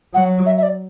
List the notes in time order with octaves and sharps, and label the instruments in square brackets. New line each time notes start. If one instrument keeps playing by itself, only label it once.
[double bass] F#3 [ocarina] F#5
[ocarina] E5
E5
D5